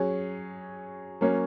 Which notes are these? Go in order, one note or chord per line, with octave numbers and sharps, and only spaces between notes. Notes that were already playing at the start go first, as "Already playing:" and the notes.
Already playing: F#3 C#4 G#4
F#3 A#3 C#4